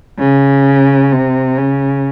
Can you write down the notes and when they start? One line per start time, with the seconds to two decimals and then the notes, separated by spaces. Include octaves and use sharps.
0.19 C#3
1.13 C3
1.58 C#3